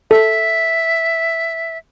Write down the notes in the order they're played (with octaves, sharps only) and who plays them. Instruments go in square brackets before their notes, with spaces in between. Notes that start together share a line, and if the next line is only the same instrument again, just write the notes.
[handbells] A4 [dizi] E5